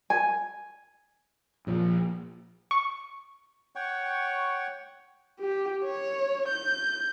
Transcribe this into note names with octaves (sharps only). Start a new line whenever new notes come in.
G#5
A#1 A#2 F3
C#6
C#5 F#5 G5 C#6
G4
C#5
G6